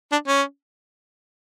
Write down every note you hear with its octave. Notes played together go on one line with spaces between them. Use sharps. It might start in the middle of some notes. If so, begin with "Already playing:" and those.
D4
C#4